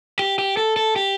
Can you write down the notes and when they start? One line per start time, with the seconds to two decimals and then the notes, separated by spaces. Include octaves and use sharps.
0.19 G4
0.38 G4
0.57 A4
0.76 A4
0.96 G4